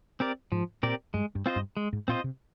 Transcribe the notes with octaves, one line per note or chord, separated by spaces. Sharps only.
C4 G4 A#4 D5
G#2 F3
A#2 C4 G4 A#4 D5
G2 G#3
G2
C4 F4 C5 D#5
G2
G#3
G#2
A#2 C4 F4 C5 D#5
C3